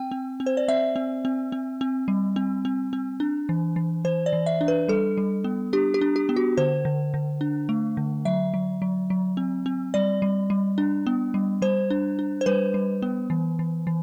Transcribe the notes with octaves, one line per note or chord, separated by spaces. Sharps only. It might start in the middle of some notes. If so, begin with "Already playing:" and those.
Already playing: C4 G5
C4
C4
C5
D5
C4 E5
C4
C4
C4
C4
G3
C4
C4
C4
D4
E3
E3
E3 C5
D5
E3
E5
D4
B4
G3 A4
G3
B3
D4 G4
G4
D4
G4
B3
F#4
D3 C5
D3
D3
D4
A3
D3
F#3 E5
F#3
F#3
F#3
C4
C4
G3 D5
G3
G3
D4
B3
G3
G3 C5
D4
D4
C5
G3 B4
G3
B3
E3
E3
E3